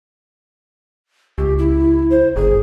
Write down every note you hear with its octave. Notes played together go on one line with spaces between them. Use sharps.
C#2 G4
E4
C5
G1 G#4